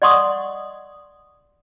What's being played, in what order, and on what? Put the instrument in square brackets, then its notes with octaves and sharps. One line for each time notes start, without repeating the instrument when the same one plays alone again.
[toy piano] D5 D#5 F#5 C6 C#6 D#6